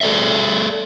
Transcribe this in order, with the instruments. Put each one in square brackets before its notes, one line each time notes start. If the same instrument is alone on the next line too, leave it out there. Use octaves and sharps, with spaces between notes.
[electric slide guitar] G#4 A4 B4 D5 E5